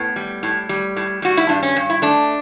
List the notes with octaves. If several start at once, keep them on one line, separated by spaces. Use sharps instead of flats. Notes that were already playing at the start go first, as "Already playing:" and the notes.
Already playing: A2 B3
G3
A2
G3
A2
G3 F#4
E4
G2 D4
C#4
G2
E4
A3 D4